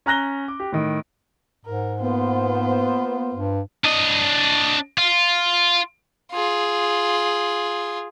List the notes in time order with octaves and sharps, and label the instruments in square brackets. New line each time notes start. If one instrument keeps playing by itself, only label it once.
[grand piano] C#4 A#5 F#6 A#6 G7
D6
G4
A2 D#3
[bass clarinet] G#2 [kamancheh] A#4
[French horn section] A#3 B3 [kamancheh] F4 C5
[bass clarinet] G2
[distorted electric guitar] D4 D#5
F4
[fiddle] F4 G#4